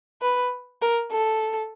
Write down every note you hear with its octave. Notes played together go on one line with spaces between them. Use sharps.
B4
A#4
A4